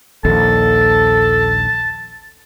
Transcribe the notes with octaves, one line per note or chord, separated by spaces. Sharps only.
A#1 D#2 A4 A5